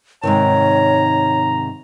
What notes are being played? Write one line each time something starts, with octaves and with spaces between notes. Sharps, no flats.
G#2 C3 D#3 C#5 A#5